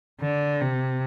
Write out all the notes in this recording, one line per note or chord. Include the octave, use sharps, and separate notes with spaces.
D3
C3